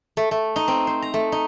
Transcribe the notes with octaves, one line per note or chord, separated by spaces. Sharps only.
A3
A3
D#4
C4
C5
A#5
A3
D#4